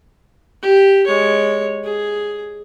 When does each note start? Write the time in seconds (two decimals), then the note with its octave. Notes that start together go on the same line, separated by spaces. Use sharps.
0.62 G4
1.07 G#3 C#5
1.84 G#4